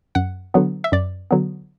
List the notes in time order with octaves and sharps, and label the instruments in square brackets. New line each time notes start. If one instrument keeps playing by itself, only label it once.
[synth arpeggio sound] F#2 F#5
D3 F#3 B3
E5
F#2 D5
D3 F#3 B3